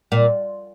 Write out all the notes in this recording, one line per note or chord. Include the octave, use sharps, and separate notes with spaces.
A#2